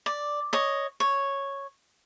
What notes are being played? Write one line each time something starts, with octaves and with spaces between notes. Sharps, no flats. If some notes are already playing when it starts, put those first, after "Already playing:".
D5
C#5 D#5
C#5